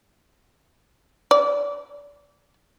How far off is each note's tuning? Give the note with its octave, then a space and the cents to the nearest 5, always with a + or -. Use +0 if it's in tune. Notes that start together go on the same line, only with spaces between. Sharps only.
D5 -30